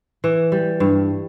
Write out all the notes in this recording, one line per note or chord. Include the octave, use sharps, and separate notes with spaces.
E3
G3
G2